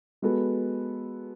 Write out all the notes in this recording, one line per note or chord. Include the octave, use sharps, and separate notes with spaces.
G#3 B3 F#4 A4